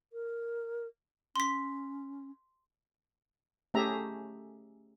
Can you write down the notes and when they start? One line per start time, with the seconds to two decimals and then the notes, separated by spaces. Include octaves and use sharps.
0.12 A#4
1.36 C#4 C6 B6
3.74 A3 C#4 G4 G#4 E5 A#5